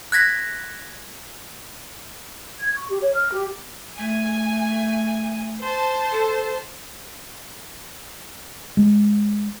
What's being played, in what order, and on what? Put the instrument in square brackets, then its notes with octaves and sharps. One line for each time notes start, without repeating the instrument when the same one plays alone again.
[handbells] F#6 G#6 A#6 B6
[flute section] G#6
C#6
G4
C#5
F6
G4
[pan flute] A3 [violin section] G#5
[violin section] C5 A5
[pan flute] A4
[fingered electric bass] G#3